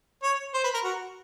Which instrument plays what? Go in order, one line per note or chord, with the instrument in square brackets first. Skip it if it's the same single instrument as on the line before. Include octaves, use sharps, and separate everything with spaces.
[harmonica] C#5
C5
B4
A#4
F#4